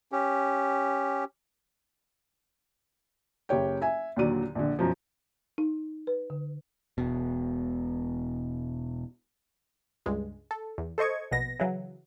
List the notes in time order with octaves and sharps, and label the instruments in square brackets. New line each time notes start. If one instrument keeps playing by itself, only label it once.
[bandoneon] C#4 G4
[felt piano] F#1 G4 C#5 G5
E5 G#5
D#2 A#2 D3 F#3 D5 D#7
A#1 D3
F#2 B2 F3
[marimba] D#4
B4
D3
[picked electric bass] E1 B2
[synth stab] C#2 G2 G#3
A4
E2
A4 C5 D#5 C#6 G#6
A#1 B2 B3 A#6
C#3 E3 F#3